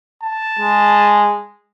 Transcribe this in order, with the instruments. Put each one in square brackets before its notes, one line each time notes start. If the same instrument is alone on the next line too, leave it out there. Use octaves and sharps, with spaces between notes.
[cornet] A5
[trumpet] G#3